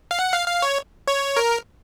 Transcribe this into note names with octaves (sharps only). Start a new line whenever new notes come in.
F5
F#5
F5
F5
C#5
C#5
A#4